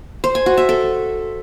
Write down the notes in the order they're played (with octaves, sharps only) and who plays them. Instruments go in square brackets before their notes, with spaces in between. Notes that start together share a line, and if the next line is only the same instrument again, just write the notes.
[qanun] C5
G#5
F#4
E5
A4